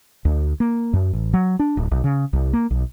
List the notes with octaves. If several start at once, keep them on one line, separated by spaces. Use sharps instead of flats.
D2
A#3
F#2
A1
F#3
D4
D1
B1
C#3
C2
A#3
B1